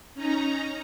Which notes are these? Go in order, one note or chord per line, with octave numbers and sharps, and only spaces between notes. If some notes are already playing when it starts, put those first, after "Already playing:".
C#4 D#4 A#5